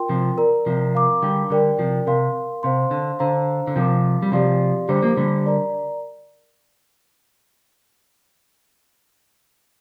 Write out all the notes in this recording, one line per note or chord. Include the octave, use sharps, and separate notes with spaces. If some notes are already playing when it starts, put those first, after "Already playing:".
Already playing: F4 A#4 G5 C6
C3 F3
A#4 D5 A#5
C3 F3
A#4 F5 A#5 D6
D3 G3
D3 G3 G4 A#4 D5 G5
C3 F3
C3 A#4 F5 C6
C3 C5 F5 C6
D3
D3 C5 F5 A#5
D3
C3 F3 A#4 F5 D6
G3
C3 F3 G4 D5 F5 C6
D3 G3 G4 C5 A#5 D6
F3 A#3
D3 G3
A#4 D5 A#5